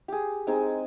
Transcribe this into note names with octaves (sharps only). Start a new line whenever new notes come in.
G4 G#4
G#3 C4 D#4 G#4